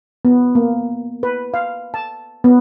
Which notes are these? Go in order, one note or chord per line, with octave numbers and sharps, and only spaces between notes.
B3
A#3
B4
F5
A5
B3